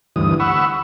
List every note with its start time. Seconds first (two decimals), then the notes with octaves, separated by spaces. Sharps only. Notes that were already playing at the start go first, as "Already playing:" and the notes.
0.16 D2 G2 E3 D#6
0.40 F#5 B5 C#6 E6